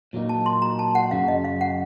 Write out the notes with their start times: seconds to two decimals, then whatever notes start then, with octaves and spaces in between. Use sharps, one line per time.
0.13 A#2 F#3 A#3 D#4
0.29 A5
0.46 C6
0.62 A#5
0.79 A5
0.95 F#5
1.11 F#2 C#3 F#3 F5
1.28 D#5
1.44 F5
1.61 F#5